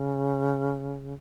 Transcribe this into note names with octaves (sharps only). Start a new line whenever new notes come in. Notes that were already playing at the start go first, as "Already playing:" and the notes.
Already playing: C#3